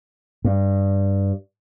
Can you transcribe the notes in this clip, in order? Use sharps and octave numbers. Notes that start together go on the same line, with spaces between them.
G2